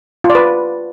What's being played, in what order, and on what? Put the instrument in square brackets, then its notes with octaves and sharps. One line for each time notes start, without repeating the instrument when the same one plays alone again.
[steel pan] F4
D5
B4